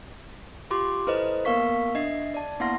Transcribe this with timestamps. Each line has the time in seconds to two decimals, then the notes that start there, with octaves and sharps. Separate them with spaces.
0.71 F4 G4 C6 D6
1.07 E4 A4 B4 C5 D#5
1.45 A#3 B3 A#4 F5 C#6 B6
1.95 D4 D#5 E5 C7
2.34 D5 A5
2.60 A#3 B3 E4 F#5 C6 A#6